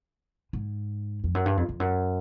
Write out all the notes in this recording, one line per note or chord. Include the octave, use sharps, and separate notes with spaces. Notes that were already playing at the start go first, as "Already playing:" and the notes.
G#2
F2
F#2
G2
F2
F2
F#2